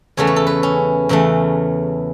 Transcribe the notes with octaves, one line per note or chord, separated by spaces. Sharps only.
E2 C#3 E3 A3 C#5
B4
A4
B4
C#4
E2 C#3 E3 A3